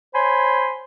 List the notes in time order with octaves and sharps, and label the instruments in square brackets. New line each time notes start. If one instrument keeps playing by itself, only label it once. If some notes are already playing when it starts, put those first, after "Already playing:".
[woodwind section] C5 C#5 G#5 B5 C6